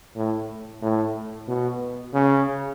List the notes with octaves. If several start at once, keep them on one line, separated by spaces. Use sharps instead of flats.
A2
A2
B2
C#3